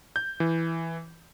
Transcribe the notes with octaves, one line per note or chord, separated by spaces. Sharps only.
G6
E3